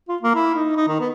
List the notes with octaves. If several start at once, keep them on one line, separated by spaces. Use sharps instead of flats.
F4
A#3
E4
D#4
D#4
D#3
B3